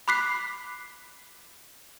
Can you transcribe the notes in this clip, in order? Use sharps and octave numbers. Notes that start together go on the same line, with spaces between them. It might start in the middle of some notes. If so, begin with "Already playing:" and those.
B5 D6 F#6 B6 C7